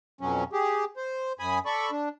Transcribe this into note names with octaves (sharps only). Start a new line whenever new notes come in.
F2 B2 F#3 C#4
G4 G#4
C5
F#2 G#5 B5 D#6
A4 D5 B5 C#6
D4